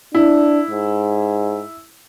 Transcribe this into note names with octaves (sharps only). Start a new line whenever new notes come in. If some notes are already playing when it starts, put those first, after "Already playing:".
D4 E4
G#2